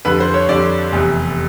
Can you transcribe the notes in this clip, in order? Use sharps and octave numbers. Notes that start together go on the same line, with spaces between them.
F2 D3 G3 B4
C5
C#5
F2 D3 G3 D5
F1 E2 C3